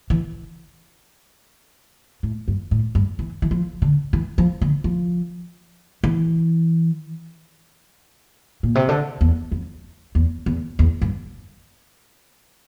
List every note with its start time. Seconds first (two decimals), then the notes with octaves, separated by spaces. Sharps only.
0.10 E3
2.23 A2
2.48 G2
2.71 A2
2.95 G2
3.19 E3
3.42 E3
3.51 F3
3.82 D3
4.13 E3
4.38 F3
4.61 D3
4.84 F3
6.04 E3
8.63 A#2
8.75 C3
8.89 D3
9.21 E2
9.52 F2
10.15 E2
10.46 E2
10.79 E2
11.02 G2